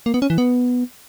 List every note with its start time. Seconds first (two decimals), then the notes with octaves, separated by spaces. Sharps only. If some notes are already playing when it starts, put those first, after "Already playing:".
0.06 A#3
0.14 B3
0.22 C#4
0.30 E3
0.38 B3